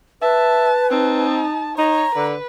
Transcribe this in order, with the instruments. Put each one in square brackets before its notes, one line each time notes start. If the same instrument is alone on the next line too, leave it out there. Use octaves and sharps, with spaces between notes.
[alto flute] B4 [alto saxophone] E5 [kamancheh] A5
[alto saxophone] C4 [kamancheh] D#4 A5
[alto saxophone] D#4 [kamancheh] C#5 [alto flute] A#5
[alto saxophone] D3 [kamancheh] B4